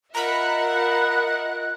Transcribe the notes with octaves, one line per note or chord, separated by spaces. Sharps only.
F4 A#4 D#5 E5 F#5 A#5 B5 F#6